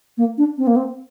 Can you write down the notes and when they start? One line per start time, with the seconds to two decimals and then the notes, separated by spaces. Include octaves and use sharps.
0.18 A#3
0.38 D4
0.58 C4
0.67 A#3
0.76 C4